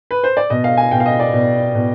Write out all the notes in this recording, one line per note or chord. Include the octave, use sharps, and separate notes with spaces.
B4
C5
D5
B2 D#5
F5
G#5
B2 G5
F5
D#5
D5
B2
B2